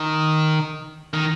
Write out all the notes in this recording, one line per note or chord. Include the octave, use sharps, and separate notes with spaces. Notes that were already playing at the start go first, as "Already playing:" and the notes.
Already playing: D#3
D#3